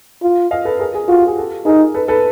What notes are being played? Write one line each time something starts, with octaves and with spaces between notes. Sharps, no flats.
F4
D#5 F5
A4 B4
G#4 A#4
G#4 A#4
F4 F#4
G4
G#4
G4 A4
D#4 G#4 A#4
A4 B4
A4 B4